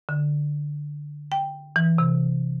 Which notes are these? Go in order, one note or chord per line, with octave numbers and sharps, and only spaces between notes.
D3
G5
E3
C3